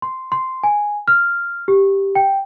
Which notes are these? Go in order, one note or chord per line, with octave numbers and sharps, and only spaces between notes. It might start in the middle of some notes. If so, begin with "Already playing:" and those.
C6
C6
G#5
F6
G4
G5